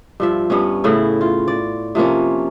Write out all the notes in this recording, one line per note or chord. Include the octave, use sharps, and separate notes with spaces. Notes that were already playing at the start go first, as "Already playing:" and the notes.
G2 F3 E5
G2 B3 C#4
A2 C#3 E4
F4
D5
C3 F3 A#3 C#4